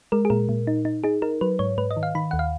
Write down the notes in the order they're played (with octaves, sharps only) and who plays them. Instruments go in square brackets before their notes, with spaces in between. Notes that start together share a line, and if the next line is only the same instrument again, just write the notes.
[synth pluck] G#3 A#4
G#4
A#2 A#4
A#2
D#4
D#4
D#4 G#4
D#4 A#4
F#3 B4
G#2 C#5
G#2 B4
D#5
D#3
F5
D#3 B5
D#2 F#5
F5